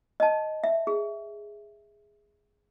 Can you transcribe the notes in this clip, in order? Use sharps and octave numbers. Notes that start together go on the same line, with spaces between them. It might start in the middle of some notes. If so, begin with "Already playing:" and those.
D#5 A5
E5
G#4